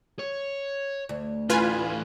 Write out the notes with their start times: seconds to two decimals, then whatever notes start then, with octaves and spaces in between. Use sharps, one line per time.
0.19 C#5
1.09 D2
1.50 A2 E3 F4 B4 G#5